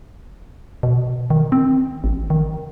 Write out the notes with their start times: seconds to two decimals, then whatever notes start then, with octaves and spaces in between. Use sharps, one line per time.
0.83 B2
1.30 D#3
1.52 C4
2.04 A1
2.30 D#3